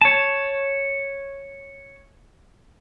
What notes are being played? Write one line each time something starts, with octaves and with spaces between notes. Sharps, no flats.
C#5 A5